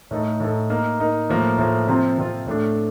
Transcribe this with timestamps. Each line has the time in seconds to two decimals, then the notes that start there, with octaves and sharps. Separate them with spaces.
0.11 A2 A3 D#4 A4
0.40 A2 A3 D#4 A4
0.70 A#3 D#4 A#4
1.00 A#3 D#4 A#4
1.30 A2 F3 A#3
1.58 A2 F3 A#3
1.88 C3 F3 C4 F4
2.18 C3 F3 C4 F4
2.47 A2 A3 D4